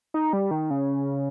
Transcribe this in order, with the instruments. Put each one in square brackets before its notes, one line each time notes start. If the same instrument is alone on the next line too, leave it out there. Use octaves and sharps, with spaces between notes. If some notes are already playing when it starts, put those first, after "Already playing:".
[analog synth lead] D#4
G3
D#3
C#3